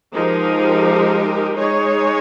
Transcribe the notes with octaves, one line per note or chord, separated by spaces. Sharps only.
F3 G#3 D#4 G4 A#4
G#3 D#4 G#4 C#5